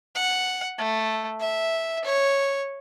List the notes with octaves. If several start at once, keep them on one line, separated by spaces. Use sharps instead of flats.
F#5
A3
E5
C#5